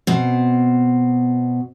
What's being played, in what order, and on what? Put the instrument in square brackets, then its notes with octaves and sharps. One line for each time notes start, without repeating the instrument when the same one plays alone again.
[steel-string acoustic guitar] B2 C4